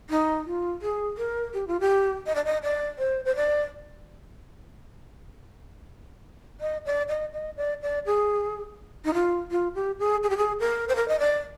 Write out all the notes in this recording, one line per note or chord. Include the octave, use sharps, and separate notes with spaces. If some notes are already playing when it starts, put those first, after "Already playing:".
D#4
F4
G#4
A#4
G4
F4
G4
D#5
D5
D#5
D5
C5
C5
D5
D#5
D5
D#5
D#5
D5
D5
G#4
D#4
F4
F4
G4
G#4
G#4
G4
G#4
A#4
C5
A#4
D#5
D5